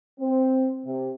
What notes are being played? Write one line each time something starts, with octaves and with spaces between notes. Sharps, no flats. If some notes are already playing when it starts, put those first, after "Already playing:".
C4
C3